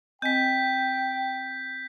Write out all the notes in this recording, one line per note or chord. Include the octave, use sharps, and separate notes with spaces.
C4 D#5 G5 G#5 G6 B6